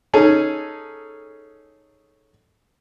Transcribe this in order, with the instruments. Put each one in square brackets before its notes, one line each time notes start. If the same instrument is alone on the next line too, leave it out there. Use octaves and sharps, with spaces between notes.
[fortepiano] C#4 D#4 G#4 A4